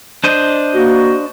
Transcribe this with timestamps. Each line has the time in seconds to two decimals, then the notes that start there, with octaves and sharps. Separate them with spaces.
0.24 D4 C5 D#5
0.74 A#3 F#4